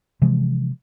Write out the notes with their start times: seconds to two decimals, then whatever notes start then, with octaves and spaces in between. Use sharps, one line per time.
0.22 C3 E3 F3 G#3